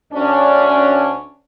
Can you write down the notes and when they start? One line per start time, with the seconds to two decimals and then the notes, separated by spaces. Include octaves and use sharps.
0.12 D2 C#4 D4